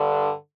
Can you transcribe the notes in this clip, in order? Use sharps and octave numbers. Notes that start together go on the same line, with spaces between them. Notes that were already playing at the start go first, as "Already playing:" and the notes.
Already playing: G2 D3